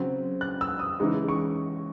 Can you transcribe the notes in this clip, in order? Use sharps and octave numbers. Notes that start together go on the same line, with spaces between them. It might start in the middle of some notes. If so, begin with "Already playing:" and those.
Already playing: C#3 F#3 C4
F#6
E6
D#6
C#3 E3 G#3 D#4
C#6